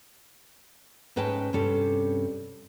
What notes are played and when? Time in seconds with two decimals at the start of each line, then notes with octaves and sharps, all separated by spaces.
1.16 G#2 C#4 B4 D#5 G5 A5
1.53 G2 C3 C#4 A4